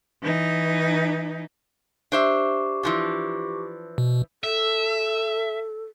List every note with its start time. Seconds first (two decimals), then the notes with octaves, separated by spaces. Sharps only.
0.23 E3 D#4
2.12 D4 G4 C5 E5 C#6 D6
2.83 E3 F3 D4
3.98 B2
4.44 A4 E5